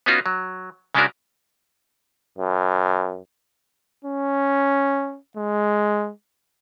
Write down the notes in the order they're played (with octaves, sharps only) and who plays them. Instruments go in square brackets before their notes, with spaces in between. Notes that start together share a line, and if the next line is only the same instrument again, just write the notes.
[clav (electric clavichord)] B3 C#4 D#4 F4 F#4
F#3
C#3 G#3 C#4 D4 F#4 A#4
[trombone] F#2
[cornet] C#4
G#3